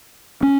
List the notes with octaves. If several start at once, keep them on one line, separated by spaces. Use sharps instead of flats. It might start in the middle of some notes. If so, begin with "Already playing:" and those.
C#4